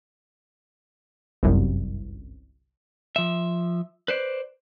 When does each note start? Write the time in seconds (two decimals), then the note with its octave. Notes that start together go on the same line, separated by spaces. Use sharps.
1.43 G1 C2 F#2
3.16 F3 E5
4.08 B4 C5 D5